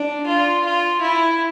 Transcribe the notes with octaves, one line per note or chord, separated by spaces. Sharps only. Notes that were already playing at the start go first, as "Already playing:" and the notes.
Already playing: D4
F4
F4
E4